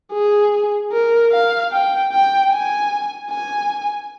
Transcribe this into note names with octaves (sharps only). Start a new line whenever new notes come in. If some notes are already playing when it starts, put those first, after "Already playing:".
G#4
A#4
F5
G5
G5
G#5
G#5